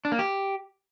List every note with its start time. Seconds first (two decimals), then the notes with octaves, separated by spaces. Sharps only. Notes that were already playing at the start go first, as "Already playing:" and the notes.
0.05 D4
0.12 A#3
0.19 G4